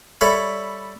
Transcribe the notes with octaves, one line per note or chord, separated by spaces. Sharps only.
G3 A4 C#5 E5 B5